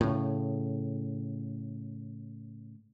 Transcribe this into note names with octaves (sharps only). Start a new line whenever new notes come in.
A2 C#3